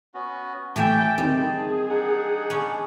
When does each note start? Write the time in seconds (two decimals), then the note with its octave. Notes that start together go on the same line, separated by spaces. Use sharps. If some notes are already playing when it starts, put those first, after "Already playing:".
0.14 B3 C#4 F#4
0.76 A2 E3 G4 E5 G5 A5
1.18 D#3 G3 C4 G#4
1.90 D4 D#4 F#5
2.50 B3 C#4